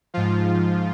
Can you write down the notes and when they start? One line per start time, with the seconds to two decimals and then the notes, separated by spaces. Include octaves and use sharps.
0.14 G#2 F3 F4